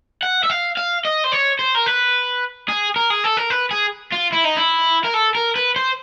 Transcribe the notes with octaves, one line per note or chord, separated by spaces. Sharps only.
F#5
E5
F5
F5
D#5
C5
C#5
C5
A#4
B4
G#4
A#4
G#4
A4
A#4
B4
G#4
F4
E4
D#4
E4
A#4
A4
A#4
B4
C5